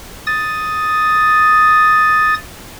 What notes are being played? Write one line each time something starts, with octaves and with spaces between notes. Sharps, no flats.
D#6 A6